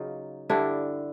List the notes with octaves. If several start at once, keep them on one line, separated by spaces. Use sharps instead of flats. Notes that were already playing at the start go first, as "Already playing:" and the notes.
Already playing: C#3 F#3 D#4 F4
G2 D3 G3 D4 E4